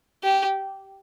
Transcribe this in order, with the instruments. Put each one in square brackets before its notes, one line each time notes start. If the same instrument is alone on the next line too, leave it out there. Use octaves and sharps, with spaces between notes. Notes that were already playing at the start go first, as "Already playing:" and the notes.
[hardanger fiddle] G4